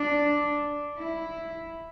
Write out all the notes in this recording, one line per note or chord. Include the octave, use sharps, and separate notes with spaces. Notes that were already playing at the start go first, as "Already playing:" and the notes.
Already playing: D4
E4